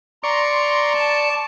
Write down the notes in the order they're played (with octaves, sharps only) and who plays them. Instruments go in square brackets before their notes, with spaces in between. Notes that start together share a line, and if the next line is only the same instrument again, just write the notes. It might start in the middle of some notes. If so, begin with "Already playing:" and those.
[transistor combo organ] D5 C#6 [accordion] A#5 C6
[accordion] A5